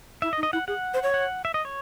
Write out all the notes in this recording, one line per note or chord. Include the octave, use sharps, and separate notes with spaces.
E4 E5
D#5
D#4
D#5
E4 F#5
G#4 F#5
C5
C#5
F#5
E5
D#5
C#5